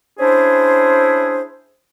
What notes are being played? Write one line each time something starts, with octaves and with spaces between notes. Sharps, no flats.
C#4 D4 E4 G#4 C5